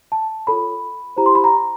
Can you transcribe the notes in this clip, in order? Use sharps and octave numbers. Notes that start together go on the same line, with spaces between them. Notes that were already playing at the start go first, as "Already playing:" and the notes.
A5
F4 A4 C#5 B5
E4 G4 C5 A#5
C6
B5
A#5